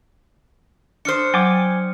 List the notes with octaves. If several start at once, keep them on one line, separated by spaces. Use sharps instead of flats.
D4 C5 D#6 F6 C#7
F#3 G5 G#5 D6